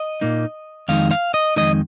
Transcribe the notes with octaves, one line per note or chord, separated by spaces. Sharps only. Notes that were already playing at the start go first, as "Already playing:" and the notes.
Already playing: D#5
A#2 A#3 D#4
F2 D#3 G#3 D#4 F5
F5
D#5
F2 D#3 G#3 D#4 D#5